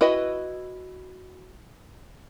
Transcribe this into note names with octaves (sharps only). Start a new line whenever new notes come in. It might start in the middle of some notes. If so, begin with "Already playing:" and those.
E4 F#4 B4 D#5